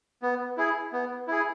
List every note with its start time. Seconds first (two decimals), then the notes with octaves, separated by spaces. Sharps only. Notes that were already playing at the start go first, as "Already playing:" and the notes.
0.22 B3
0.57 E4 G#4
0.93 B3
1.27 E4 G#4